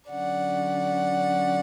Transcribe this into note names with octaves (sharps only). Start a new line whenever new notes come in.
D3 F#3 C#4 D5 F#5